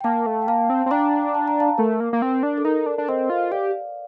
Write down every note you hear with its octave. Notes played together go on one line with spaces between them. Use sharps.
G5
A#3 F5 A5
A3
G5
A#3 F5 A5
C4
C4
D4 G5 A#5
A5
A#5
F5 A5
A3 A#4
A#3
A#3
C4
D4
A4
D#4 A#4
D4
D4
C4 C5 D#5
F4
G4 D5 F5